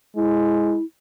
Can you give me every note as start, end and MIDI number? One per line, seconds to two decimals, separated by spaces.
0.16 0.77 56
0.16 0.83 64